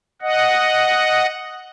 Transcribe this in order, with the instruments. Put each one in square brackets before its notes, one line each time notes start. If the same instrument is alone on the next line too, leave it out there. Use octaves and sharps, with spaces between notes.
[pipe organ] D#5 F#5